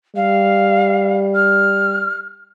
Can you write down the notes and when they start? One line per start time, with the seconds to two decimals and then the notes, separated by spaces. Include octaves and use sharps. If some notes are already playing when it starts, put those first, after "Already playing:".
0.16 G3 F5
1.35 F6